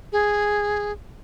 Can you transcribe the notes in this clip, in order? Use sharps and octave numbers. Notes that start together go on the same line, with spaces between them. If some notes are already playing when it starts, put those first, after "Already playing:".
G#4